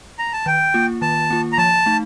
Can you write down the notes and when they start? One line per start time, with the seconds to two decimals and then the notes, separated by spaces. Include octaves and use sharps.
0.19 A#5
0.33 A5
0.46 D#3 G5
0.74 A#3 F4
1.02 D#3 A5
1.30 A#3 F4
1.52 A#5
1.58 F3 A5
1.86 A3 D#4